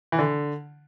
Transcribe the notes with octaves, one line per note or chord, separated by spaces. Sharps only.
E3
D3